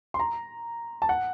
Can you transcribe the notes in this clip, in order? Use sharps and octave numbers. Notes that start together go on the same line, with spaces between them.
C6
A#5
A5
F#5